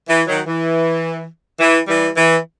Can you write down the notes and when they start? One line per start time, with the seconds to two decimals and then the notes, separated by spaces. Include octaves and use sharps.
0.08 E3
0.27 D#3 F#3
0.47 E3
1.59 E3
1.88 E3 G3
2.16 E3